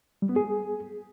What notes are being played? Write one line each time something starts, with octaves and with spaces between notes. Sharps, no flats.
G3
B3
G#4